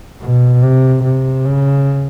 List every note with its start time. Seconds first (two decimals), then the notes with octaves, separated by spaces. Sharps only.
0.21 B2
0.62 C3
1.03 C3
1.46 C#3